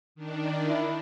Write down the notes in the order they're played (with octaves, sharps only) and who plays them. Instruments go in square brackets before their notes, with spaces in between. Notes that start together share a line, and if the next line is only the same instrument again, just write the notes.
[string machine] D#3 D4
[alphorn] E4